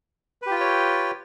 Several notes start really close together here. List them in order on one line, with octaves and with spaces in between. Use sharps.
B4 G4 F4 G5 C#5